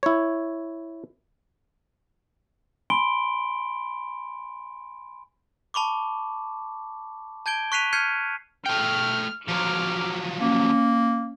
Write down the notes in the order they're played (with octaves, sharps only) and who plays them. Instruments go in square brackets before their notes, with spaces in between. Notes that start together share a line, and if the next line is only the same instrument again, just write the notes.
[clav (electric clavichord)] E4 C#5
[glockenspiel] G#5 B5 C6 D7 G7
A5 B5 C#6 D6
A5 G6 G#6 D7 G7
C#6 F#6 B6 C7 D#7 F7
F6 G6 G#6 C7 C#7 D#7
[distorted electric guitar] A3 G5 [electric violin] F6
[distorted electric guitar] F3 F#3 [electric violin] D6 F6
[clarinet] A#3 [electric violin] C#4